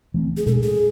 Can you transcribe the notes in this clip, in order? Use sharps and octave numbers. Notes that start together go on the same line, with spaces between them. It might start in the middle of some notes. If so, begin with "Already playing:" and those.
E3 A3 C4
G#4
B2 G#3 D4 A4
G#4